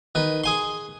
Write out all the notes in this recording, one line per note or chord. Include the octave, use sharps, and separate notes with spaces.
D#3 B4
G#4 G#5 C6